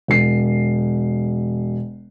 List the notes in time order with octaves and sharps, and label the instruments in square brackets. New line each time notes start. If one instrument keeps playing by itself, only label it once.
[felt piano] E1 C7